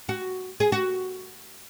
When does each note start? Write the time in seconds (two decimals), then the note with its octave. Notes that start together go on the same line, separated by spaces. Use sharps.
0.09 F#4
0.60 G#4
0.72 F#4